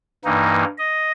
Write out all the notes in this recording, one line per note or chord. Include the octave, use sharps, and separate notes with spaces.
G2 E3 A#3 D#4
D#5